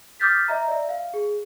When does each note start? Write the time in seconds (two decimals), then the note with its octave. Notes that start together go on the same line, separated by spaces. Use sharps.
0.20 D6 D#6 F6 G6 A6 B6
0.48 D#5 E5 A#5
0.68 D5 E5
0.89 F5
1.14 G#4